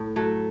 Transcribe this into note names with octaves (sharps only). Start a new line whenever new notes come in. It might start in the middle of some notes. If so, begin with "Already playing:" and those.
Already playing: A2
F#3 A3